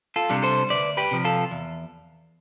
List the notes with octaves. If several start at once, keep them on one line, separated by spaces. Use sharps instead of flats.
F4 A4
C3 G3 D4
A4 C5
D2 B4 D5
G4 B4
C3 F3
F4 A4
E2